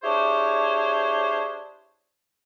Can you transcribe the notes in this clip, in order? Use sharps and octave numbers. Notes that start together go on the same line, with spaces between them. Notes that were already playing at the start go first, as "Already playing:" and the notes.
D4 E4 G4 G#4 C5 C#5